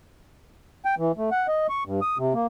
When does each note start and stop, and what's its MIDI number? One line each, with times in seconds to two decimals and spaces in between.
0.85 0.95 79
0.98 1.12 52
1.17 1.30 57
1.32 1.47 78
1.48 1.67 75
1.69 1.84 85
1.86 2.00 43
2.02 2.18 87
2.18 2.34 48
2.34 2.47 58